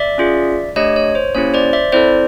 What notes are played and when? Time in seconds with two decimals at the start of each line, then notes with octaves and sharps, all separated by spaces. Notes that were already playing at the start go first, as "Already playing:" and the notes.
Already playing: D5 E5
0.18 C#4 F4 G#4
0.76 A3 D4 G4 C#5 D#5
0.96 C#5
1.15 C5
1.35 A#3 C#4 E4 G4 C#5
1.54 C5 D5
1.73 D5 E5
1.92 C4 E4 A4 C5 D5